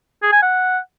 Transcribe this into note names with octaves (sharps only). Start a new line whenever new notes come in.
G#4
G#5
F#5